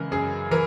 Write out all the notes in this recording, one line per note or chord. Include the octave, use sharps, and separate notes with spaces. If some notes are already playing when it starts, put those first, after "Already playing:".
Already playing: C#3 E3 G#3 A#4
F#2 G#4
E3 A#4